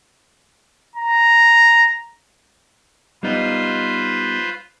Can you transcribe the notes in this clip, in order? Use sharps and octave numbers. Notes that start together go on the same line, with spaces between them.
A#5
G3 B3 D#4 F4 B4 C5